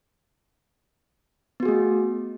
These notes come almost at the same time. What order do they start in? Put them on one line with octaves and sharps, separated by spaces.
B3 F#4 G#4 A3